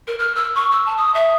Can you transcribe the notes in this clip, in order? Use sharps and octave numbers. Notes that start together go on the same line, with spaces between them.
A#4
F6
E6
C#6
E6
A5
D#6
E5